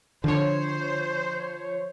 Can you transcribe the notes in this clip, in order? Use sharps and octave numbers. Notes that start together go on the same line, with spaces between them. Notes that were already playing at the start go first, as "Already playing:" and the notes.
D3 F3 C5 C#5